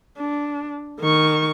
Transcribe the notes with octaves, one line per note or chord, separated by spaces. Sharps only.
D4
D#3 C#6